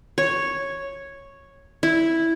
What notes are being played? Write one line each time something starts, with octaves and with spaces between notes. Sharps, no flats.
C#5
E4